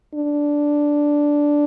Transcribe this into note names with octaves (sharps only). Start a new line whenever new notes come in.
D4